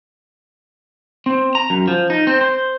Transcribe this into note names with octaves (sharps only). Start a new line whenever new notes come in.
C4
A#5
F#2
F3
D#4
C4
C5